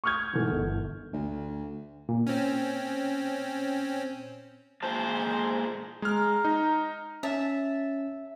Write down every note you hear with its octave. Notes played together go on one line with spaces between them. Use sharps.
C#6 D#6 F6 G6 G#6
G#2 B2 D#3 E3 A3
G1
D2
A#2
C4 C#4
A#2 G#3 C5 A5 C6
G#3 A#5 F6
D#4
C#4 E5 A5